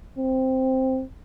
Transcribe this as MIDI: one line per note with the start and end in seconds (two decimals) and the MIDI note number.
0.19 1.03 60